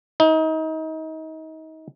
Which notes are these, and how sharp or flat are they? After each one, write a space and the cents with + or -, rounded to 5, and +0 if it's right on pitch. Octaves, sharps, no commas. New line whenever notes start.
D#4 +30